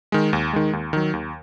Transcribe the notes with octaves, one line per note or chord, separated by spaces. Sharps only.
D#3 G#3
D#2
D#3 G#3
D#2
D#3 F#3
D#2